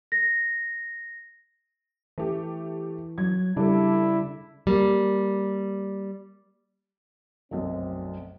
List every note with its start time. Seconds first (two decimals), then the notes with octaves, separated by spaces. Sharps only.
0.12 A#6
2.18 E3 A3 G4
3.18 F#3 G#6
3.57 C#3 G3 D4 E4 A4
4.67 G3 A#3
7.51 F1 B1 F#2 C4